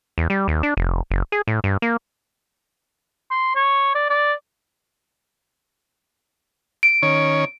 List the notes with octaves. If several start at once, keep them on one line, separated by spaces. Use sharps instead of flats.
E2
G3
D#2
D4
F1
F#1
G#4
A2
G2
A#3
C6
C#5
D5
D5
D7
D#3 C#4 C#5